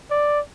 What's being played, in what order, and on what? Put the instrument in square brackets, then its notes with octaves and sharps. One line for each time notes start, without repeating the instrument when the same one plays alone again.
[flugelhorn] D5